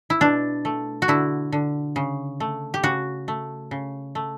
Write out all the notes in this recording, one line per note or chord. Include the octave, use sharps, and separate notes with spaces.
E4
B2 D4
A3
F#4
D3 E4
D3
C#3
A3
G4
C#3 F#4
A3
C#3
A3